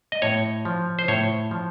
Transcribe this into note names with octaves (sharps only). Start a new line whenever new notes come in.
D#5
A2 C#5
F3
C5
A2 C#5
F3